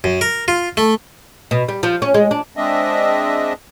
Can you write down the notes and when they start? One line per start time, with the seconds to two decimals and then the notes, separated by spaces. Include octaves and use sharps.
0.04 F#2
0.21 A#4
0.48 F4
0.77 A3
1.51 B2
1.68 G3
1.83 F3
2.02 C#4
2.14 G#3
2.31 D4
2.57 G#3 C4 D4 D#5 E5